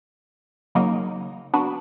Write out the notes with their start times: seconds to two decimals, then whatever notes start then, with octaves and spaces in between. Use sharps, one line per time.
0.75 C#3 F#3 A#3 D#4
1.54 B3 D4 F#4